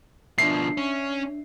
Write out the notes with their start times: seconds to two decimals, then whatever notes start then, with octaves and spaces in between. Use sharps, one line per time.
0.38 B2 F3 D4 E5 C7
0.77 C#4